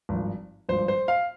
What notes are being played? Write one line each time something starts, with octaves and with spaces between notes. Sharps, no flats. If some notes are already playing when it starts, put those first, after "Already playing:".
G#1 G2 F3
G#1 G2 F3 C5
C5
F5